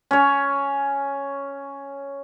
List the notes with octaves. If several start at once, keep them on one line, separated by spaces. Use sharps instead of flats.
C#4 C#5